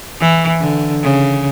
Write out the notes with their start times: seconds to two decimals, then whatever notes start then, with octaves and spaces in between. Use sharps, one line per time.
0.21 E3
0.60 D3
1.03 C#3